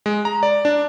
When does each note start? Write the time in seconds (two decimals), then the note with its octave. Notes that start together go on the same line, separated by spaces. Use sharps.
0.06 G#3
0.25 A#5
0.43 D5
0.65 D4